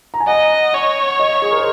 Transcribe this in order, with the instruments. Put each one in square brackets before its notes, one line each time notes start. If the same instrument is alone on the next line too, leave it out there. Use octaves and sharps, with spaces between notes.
[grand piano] A#5
G#5
[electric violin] D#5 [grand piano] F#5
[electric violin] C#5 [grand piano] F#5
[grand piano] D#5
G#4
A#4
C5